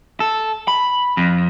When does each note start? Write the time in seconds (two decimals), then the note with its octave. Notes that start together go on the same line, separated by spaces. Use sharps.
0.20 A4
0.68 B5
1.17 F2